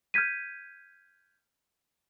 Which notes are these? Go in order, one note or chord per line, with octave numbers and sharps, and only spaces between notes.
F6 G6 G#6 B6 D#7